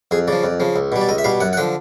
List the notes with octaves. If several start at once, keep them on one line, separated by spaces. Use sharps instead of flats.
F2 G#4
C#3 F3 D5
F2
C#3 F3
C#2
B2 G3
D5
C#2 D#5
E5
B2 G3 F5
F#2 F#5
F#5
D3 F3 G5